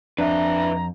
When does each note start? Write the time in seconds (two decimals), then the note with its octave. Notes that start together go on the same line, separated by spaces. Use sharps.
0.18 F2 D4 B4 E5 A#5